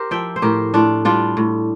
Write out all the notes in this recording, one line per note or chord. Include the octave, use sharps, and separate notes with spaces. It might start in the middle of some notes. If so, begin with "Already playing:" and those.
Already playing: G4 A#4 C5
F3 E5 G5
C5
A2 G4 A#4
A2 D4 F4
G3 D4 F4
A2